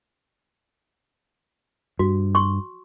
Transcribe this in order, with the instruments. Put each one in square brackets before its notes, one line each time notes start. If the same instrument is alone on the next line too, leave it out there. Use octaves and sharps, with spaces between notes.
[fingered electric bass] G2 [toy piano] F#4
[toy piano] C6 C#6